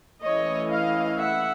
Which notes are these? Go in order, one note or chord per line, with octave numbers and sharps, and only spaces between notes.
E3 A3 C#4 E4 C#5 D#5
D#5 F5
E5 F#5